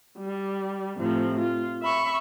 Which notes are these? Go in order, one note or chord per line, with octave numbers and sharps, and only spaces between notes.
G3
A2 C3 F3
F4
E5 B5 C#6